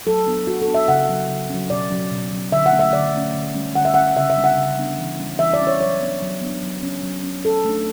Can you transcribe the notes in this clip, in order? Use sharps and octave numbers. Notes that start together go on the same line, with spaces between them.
F#3 A4
B3 D4
F#3 F#4
A4
B3 D4
E5
C#3 F#5
F#3 C#4
C#3
F#3 C#4
B2 D5
F#3 C#4
B2
F#3 C#4
D3 E5
F#5
A3 C#4
E5
D3 D5
A3 C#4
D3
G3 C#4
D3 F#5
E5
G3 C#4 F#5
C#3 E5
E5
G3 B3 D4
F#5
C#3
G3 B3 D4
E3
G3 C#4
E3 E5
D5
G3 C#4
C#5
F#3 C#5
B3 D4
F#3
B3 D4
F#3
C#4
F#3
C#4
F#3 A4
A3 D4